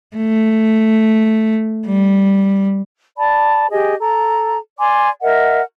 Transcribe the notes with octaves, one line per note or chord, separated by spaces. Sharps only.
A3
G3
D5 A5 B5
G4 G#4 D#5 G#5
A4 A#5
D5 G#5 C6 D6
A#4 D#5 E5 F#5